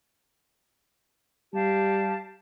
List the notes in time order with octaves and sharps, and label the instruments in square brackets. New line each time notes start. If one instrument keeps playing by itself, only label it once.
[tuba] G3 [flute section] G4 F5 A5